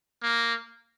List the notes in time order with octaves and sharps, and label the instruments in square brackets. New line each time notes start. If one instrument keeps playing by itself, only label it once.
[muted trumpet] A#3